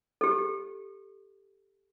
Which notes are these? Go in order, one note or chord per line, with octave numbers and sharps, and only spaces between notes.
G4 A4